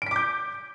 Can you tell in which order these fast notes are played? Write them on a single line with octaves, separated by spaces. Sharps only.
D7 B6 D6 G6